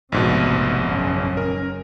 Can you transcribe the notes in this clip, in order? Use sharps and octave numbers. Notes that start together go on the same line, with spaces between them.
F1 A#1 G#2 B2 C4
F#1 C#4
A#4